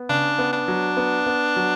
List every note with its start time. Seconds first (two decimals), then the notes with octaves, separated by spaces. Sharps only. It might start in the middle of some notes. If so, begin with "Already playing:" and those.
Already playing: B3
0.09 C#3 D4
0.38 B3
0.53 D4
0.68 F#3
0.97 B3
1.26 B3
1.56 F#3